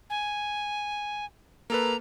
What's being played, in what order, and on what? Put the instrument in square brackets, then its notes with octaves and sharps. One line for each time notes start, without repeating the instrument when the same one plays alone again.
[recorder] G#5
[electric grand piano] A#3 A4 B4 [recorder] A#5